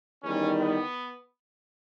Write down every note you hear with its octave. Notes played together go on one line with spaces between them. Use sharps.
E2 D#3 G3 C#4
B3